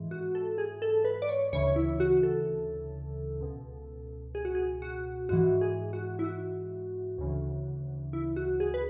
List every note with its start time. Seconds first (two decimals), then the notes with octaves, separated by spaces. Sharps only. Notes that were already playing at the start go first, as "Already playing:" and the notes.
Already playing: G#2 E3
0.11 F#4
0.35 A4
0.58 G#4
0.82 A4
1.05 B4
1.22 D5
1.29 C#5
1.53 D2 C#3 E3 C#5
1.76 E4
2.00 F#4
2.23 A4
3.41 C#2 B2
4.35 G#4
4.45 F#4
4.55 G#4
4.82 F#4
5.29 G#2 E3 F#4
5.61 G#4
5.93 F#4
6.19 E4
6.24 F#4
7.18 D2 C#3 E3
8.13 E4
8.36 F#4
8.60 G#4
8.74 B4